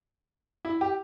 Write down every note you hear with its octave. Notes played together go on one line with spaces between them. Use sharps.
E4
G4